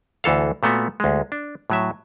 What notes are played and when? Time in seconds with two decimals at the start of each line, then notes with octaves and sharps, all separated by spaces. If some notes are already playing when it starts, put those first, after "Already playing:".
0.24 D2 E3 A4 F5
0.63 A#2 A3 B3 F#4
1.00 D2 G#3
1.32 D4
1.70 A2 F#3 E5